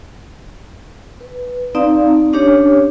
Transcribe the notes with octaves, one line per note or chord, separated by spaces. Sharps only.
B4
C4 D#4 D5 F5 A#5
C#4 D4 G4 C#5